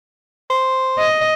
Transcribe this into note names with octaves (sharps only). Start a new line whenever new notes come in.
C5
D#5